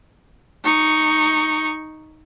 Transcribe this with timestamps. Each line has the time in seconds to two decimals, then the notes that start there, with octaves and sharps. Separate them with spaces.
0.64 D#4 C#6